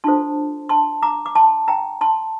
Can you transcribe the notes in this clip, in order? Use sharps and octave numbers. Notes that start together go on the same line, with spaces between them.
D4 F4 A4 C5 A5 C6
A5 C6
A#5 D6
D6
A5 C6
G5 A#5
A5 C6